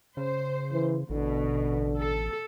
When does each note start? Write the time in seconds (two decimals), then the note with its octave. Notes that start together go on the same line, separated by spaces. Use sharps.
0.17 C#3 C5
0.73 E3
1.10 A1 B2 D3
1.98 A4